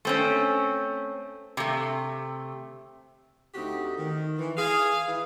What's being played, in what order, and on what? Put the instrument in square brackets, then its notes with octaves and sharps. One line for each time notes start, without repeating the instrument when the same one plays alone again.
[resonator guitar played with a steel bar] A3 C4 C#4
C3 A3
[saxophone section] D2 C4 D#4 F#4 G4
D#3
E3
G#4 F5
E3